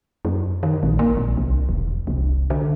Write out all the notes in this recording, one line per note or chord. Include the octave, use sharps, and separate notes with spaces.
F#2
D#3
A#1
A#3
A#1
C2
E1
C2
D3